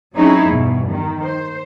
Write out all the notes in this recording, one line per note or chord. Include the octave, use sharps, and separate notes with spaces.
F#3 C4 C#4 D#4 E4 G#4
E2 G2 B2
D#3
C5